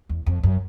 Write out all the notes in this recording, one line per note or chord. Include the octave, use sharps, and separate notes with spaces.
E2
F2
F#2